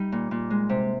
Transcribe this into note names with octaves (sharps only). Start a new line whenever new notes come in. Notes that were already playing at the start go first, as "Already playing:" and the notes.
Already playing: G3 D#4
A#2
A#2
G#3
C3